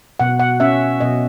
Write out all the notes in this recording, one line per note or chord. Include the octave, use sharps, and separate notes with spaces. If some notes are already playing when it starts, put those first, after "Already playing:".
B2 F#5
F#5
C#4 E5
B2 D#5